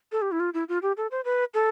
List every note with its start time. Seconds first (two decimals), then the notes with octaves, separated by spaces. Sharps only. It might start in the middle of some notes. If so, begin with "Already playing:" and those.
0.12 A4
0.22 G4
0.31 E4
0.40 F4
0.54 E4
0.69 F4
0.82 G4
0.97 A4
1.11 C5
1.25 B4
1.54 A4